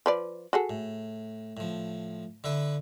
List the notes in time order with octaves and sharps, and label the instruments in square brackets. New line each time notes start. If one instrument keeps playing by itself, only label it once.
[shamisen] F3 B4 D5
F#4 G#4 A4
[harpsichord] A2
A2 F3
D3 E4 B4